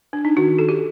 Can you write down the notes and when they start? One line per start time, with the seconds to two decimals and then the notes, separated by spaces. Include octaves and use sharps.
0.13 D4
0.25 D#4
0.37 D#3 F#4
0.59 A4
0.69 G4